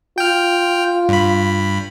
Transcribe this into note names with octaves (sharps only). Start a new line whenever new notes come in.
F4 G5 F6
G2 B5